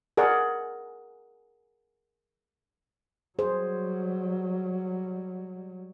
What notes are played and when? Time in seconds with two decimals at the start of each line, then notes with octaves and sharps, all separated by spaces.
0.17 G#4 A#4 D5 F#5
3.39 F#3 G3 G#4 C5